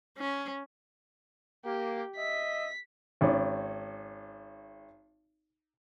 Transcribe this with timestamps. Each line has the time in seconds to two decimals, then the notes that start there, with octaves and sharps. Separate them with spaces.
0.18 C#4
1.65 A#3 G4
2.16 D#5 E5 B6
3.21 G#1 C#4 D5